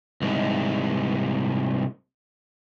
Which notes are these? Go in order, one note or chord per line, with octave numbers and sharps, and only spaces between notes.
C2 G#2